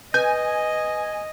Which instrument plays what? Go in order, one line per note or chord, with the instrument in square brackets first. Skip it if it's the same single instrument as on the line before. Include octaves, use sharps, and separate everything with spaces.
[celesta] B4 [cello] D#5 [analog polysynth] G#5 [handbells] G6